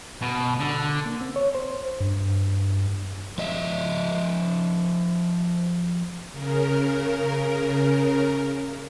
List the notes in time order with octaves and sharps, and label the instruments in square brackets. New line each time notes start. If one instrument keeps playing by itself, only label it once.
[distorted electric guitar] B2
D3
[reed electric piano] A#3
C4
C#5
C5
[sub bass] G2
[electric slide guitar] F3 D#5 E5
[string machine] C#3 A#4